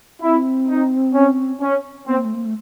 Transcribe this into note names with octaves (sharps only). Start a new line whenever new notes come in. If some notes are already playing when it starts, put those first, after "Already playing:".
C4 E4
D#4
C#4
C#4
B3 C4
A#3
A3
A#3
A3